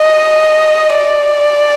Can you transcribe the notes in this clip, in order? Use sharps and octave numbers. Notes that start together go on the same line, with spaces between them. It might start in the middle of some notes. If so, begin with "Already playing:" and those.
Already playing: D#5
D5